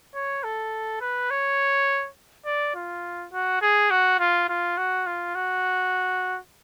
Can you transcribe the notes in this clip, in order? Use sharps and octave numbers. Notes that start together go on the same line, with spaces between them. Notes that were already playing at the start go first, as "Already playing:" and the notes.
C#5
A4
B4
C#5
D5
F4
F#4
G#4
F#4
F4
F4
F#4
F4
F#4